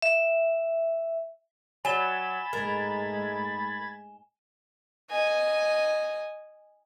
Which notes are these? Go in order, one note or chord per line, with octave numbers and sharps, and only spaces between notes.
E5
F#3 G#5 B5 G#6 A6 E7 G7
G#2 G#3 A3 A#4
D#5 G#5